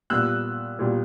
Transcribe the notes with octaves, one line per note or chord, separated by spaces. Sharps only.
A#2 G3 B3 E6 F#6
A#2 G3 B3